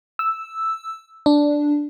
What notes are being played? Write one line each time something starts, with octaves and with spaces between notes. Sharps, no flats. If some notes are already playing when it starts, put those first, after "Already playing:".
E6
D4